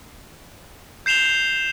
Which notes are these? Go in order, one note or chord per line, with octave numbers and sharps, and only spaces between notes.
G6 C7 E7 F7 G7